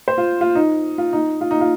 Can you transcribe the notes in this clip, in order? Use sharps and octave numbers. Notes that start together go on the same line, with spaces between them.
C5
F4
F4
D#4
F4
D#4
F4
D#4
F4